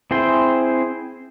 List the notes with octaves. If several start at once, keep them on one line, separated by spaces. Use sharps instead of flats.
C4 E4 G#4 C5 G5